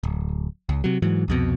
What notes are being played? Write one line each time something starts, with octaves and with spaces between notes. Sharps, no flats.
D1
C#2
C3 F#3
G#2 E3 F#3
C2 F2 B2